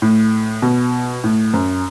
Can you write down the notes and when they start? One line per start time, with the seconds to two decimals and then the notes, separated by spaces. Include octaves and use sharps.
0.02 A2
0.62 B2
1.24 A2
1.54 F#2